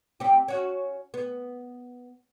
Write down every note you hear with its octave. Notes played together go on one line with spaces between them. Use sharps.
C4 G4
C#4 F#4
B3